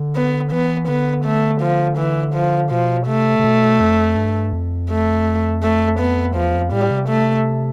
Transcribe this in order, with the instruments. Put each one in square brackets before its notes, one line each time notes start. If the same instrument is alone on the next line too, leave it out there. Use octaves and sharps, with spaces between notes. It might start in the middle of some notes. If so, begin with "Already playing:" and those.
Already playing: [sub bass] D3
[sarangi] B3
[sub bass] E3 [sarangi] B3
[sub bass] D3 [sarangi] B3
[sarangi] A3
F3
E3
F3
[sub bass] B2 [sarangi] F3
[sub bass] C3 [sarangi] A3
[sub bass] C3
B2
F2
G2
F2
[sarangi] A3
A3
B3
[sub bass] E2 [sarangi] F3
[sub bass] F2
[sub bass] A2 [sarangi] G3
[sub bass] C3
[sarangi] A3